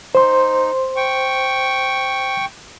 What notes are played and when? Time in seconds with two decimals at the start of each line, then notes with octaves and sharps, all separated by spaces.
0.15 D#4 C5 C6
0.96 G5 C#6